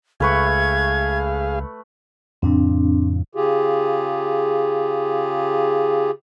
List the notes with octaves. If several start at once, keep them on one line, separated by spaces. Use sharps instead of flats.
C#2 A3 G#4 B4 F5 C#6 G#6
F2 A2 C#3 C4 D4
C#3 F4 G4 G#4